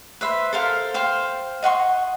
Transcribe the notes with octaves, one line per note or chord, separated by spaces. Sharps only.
B4 C5 E5
A4 A#4 C5 F5
C5 F5 G5
D#5 F#5 C6 C#6